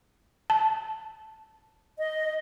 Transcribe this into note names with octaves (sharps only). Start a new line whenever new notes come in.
A5
D#5